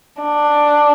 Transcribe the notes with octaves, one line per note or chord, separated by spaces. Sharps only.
D4